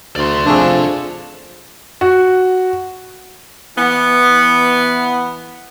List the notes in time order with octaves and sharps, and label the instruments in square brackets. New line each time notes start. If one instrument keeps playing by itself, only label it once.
[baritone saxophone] D2 [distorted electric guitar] D5 C6
[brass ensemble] F2 F3 [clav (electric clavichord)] A3 G#4 [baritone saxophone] D4
[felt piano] F#4
[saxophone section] E3 B3